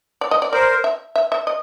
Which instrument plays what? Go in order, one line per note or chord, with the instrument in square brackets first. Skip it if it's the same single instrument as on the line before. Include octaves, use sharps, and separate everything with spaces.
[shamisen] D5
D#5
D5
[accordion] A#4 C5 [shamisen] D5
[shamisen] E5
E5
E5
D#5